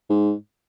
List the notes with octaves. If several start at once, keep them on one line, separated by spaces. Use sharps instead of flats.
G#2